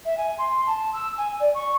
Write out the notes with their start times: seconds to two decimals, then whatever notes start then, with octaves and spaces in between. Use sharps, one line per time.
0.05 E5
0.18 G#5
0.38 C6
0.67 A5
0.94 E6
1.18 G#5
1.40 D5
1.55 C#6